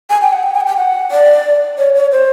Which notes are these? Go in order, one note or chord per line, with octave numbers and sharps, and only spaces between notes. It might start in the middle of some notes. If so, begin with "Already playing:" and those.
G#5
G5
F#5
G5
G#5
F#5
G5
F#5
D5
C#5
C#5
C5